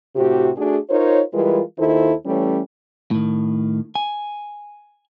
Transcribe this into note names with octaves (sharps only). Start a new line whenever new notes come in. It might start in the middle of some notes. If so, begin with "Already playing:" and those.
A2 C3 C4 F#4 G4
A3 D4 F#4 G#4
D#4 F4 A#4 C5 C#5
E3 G3 G#3 F4 A#4 B4
D#2 D#3 E4 F4 A4 C5
E3 G3 A3 C#4
A2 D#3
G#5